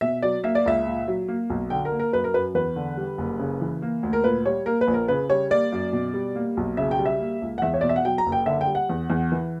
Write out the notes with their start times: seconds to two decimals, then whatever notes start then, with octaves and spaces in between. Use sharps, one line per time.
0.01 B2 E5
0.22 F#3 D5
0.44 A#3 E5
0.55 D5
0.66 C#2 E5
0.87 A#2
1.08 F#3
1.28 A#3
1.50 B1
1.70 D3 G5
1.85 A#4
1.92 A#3
1.99 A#4
2.13 F#2 B4
2.24 A#4
2.34 F#2 B4
2.55 E2 B4
2.76 D3
2.97 G3
3.18 F#1
3.39 C#3
3.61 E3
3.82 A#3
4.03 D2
4.13 A#4
4.24 A#2 B4
4.46 G3 C#5
4.66 A#3 A#4
4.81 B4
4.88 A#1
4.94 A#4
5.08 C#3 B4
5.29 G3 C#5
5.51 A#3 D5
5.72 F#2
5.93 B2
6.14 G3
6.36 A#3
6.57 B1
6.77 C#3 E5
6.91 G5
6.99 G3
7.06 E5
7.20 A#3
7.42 C#2
7.58 F#5
7.62 E2 E5
7.74 C#5
7.81 B2 D5
7.89 E5
7.96 F#5
8.05 F#3 G5
8.18 A#5
8.26 F#1
8.32 G5
8.46 D3 E5
8.61 G5
8.67 G3
8.75 F#5
8.90 E2
9.10 E2
9.32 E3